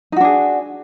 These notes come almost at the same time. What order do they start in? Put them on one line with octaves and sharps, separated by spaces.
D#4 F#4 D4 G#4